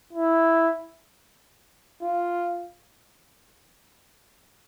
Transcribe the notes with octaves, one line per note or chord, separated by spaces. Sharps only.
E4
F4